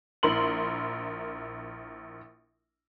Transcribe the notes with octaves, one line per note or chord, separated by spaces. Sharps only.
A#1 E4 A#4 C6 F#7